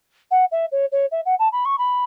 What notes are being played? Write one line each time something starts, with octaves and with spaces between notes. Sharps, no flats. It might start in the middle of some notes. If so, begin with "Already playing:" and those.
F#5
E5
C#5
C#5
E5
F#5
A5
B5
C#6
B5